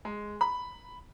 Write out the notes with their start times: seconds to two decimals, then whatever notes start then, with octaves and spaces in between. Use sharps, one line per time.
0.05 G#3
0.41 B5